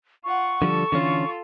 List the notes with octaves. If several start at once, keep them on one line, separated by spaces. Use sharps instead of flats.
F4 F#5 C#6
D3 F3 G3 A4
D3 E3 C#4 F4 A4